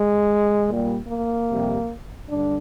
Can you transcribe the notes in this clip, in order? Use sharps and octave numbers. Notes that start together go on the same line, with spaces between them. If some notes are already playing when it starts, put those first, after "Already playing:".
Already playing: G#3
A#2 G3
A#3
F2 C3 G3
G2 D3 D4